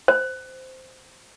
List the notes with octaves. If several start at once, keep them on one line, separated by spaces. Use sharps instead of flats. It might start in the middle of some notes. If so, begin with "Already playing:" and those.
C5